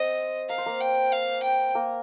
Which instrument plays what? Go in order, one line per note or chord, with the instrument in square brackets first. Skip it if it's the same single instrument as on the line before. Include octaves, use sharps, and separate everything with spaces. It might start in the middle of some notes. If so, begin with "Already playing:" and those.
Already playing: [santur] C4 C5 [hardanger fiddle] D#5
[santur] A#4 [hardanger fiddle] F5
[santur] C5
A#3 A#4
[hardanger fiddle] G5
F5
G5
[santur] A#3 A#4